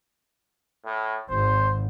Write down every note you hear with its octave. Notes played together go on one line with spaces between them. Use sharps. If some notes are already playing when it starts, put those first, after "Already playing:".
A2
G#1 C5